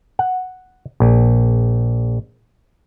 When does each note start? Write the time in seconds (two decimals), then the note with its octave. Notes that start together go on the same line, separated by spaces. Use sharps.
0.19 F#5
1.00 A#1